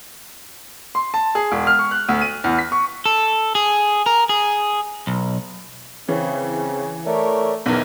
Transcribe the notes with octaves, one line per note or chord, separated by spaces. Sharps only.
C6
A5
G#4
E1
F6
C#6
F#6
D2
D#7
E2
B6
C#6
A4
G#4
A#4
G#4
B1
C#3 E3 C4
A3 A#4 C#5 D5
B1 E2 D#3 E3